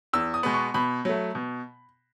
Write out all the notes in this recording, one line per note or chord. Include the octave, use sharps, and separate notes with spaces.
E2 E6
D#6
B2 G#3 B3
C#6
B2 B5
F#3 A3
B2